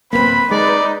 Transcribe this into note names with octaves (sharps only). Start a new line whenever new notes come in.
D1 D#2 A#3 C4 B4 B5
G#3 D#4 D5